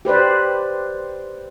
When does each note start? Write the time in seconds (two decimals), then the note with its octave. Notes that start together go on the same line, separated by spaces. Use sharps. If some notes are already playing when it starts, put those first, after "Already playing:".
0.05 G4 B4 C5 D5